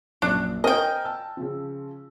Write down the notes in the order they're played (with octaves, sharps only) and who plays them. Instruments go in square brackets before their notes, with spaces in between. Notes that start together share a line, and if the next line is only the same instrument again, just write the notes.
[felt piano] A#1 F#2 A#3 [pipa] D4
[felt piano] A#4 C5 G#5 [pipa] D#5 G5
[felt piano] A5 E6
C#3 F3